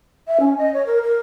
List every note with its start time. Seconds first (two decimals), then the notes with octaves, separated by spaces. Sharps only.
0.27 E5
0.40 C#4
0.58 D#5
0.73 C#5
0.86 A#4
1.02 A#4